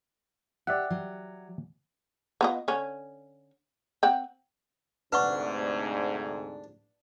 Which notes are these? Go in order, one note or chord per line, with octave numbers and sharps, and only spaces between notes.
G4 D5 E5 F#5
F#3
B3 F4 D#5
D3 C#4
C4 F#5 G5
D2 G#2 C3 D4 B4 F#5 C#6